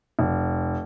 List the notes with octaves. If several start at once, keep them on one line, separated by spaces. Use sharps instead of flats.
F1